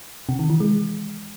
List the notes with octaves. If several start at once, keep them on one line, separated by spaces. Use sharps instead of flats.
C3
D#3
E3
G#3